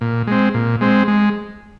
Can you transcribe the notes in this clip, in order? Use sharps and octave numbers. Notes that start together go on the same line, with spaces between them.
A#2
G#3 C4
A#2
G#3 C4
G#3